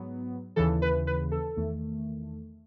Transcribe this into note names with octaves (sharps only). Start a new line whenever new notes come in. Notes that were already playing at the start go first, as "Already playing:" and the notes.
Already playing: G#2 F#3 B3
D#2 C#3 E3 A4
B4
B4
A4
E2 D#3 A3